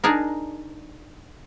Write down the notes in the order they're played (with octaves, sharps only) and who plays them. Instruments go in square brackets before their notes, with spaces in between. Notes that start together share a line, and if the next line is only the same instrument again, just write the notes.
[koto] D4 D#4 G#4 A#4